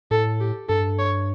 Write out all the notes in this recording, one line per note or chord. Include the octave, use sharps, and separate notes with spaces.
A2 A4
G4
G2 A4
C#5